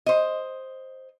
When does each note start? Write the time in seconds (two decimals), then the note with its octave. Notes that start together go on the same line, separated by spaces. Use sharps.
0.06 C5 D#5